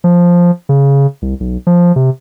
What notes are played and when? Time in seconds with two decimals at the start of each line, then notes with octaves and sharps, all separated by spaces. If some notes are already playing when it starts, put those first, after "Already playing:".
0.04 F3
0.69 C#3
1.22 C2
1.40 B1
1.67 F3
1.96 C3